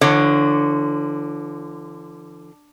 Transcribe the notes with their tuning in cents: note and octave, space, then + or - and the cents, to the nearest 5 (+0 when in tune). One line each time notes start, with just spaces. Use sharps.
D3 +5 F3 -45 C#5 +0